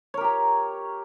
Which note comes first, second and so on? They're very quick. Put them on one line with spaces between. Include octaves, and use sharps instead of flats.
C#5 A#4 G4 A#5